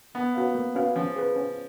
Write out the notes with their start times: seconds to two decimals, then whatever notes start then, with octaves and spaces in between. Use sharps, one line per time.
0.14 A#3 B3
0.35 C#4 F#4 B4 F5
0.55 A#3
0.75 C#4 F#4 B4 F5
0.96 F3 C#4
1.16 G#4 B4
1.36 C#4